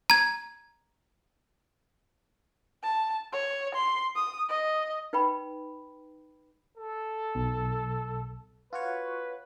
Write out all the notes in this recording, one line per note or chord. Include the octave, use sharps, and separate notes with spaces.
A#5 G#6
A5
C#5
C6
D#6
D#5
D#4 B4 G5 B5
A4
B1
F4 F#4 B4 C#5